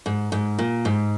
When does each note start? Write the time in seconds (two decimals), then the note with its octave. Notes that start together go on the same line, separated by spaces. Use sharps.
0.06 G#2
0.32 G#2
0.59 A#2
0.85 G#2